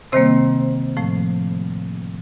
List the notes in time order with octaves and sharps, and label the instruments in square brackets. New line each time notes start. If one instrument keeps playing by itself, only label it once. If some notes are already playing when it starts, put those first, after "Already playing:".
[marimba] C3 D#3 G3 A#3 C4 C5
A2 F3 A3